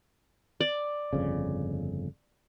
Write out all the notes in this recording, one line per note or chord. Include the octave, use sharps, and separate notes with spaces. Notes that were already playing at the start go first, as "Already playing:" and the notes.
D5
G1 F2 C#3